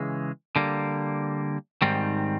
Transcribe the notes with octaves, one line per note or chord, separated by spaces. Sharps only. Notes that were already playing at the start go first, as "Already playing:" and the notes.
Already playing: C#3 E3 G#3
D3 G3 A#3
G#2 D#3 G3 C4